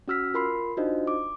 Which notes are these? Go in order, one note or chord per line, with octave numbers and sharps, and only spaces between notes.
C#4 F#4 E6 F6 B6
F4 A#4 B5 C6 C7
D4 D#4 F4 F#4 C5 D#5
D6